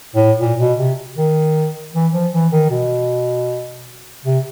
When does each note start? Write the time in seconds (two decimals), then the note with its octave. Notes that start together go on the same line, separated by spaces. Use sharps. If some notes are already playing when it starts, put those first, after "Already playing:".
0.15 A2
0.40 A#2
0.60 B2
0.79 C3
1.18 D#3
1.94 E3
2.13 F3
2.33 E3
2.52 D#3
2.70 B2
4.25 C3